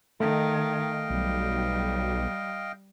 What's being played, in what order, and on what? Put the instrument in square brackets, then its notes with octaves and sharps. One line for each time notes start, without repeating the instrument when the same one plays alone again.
[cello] D#3 [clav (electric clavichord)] A3 [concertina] D#5 F5 G5
[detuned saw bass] B1 [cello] G3